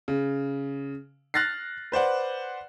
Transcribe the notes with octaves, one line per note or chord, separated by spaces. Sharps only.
C#3
F6 F#6 A6 A#6 C7
B4 C5 D5 F#5